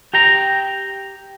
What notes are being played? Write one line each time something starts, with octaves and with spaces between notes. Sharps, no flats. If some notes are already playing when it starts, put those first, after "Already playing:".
G4 G5 A#5